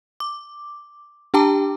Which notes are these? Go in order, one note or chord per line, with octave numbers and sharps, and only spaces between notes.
D6
D4 G4 G5 A5 A#5 D6